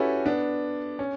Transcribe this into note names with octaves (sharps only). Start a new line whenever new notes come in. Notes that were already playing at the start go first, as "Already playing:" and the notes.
Already playing: C#4 E4 F#4 G4 A4 B4
B3 D4
C#4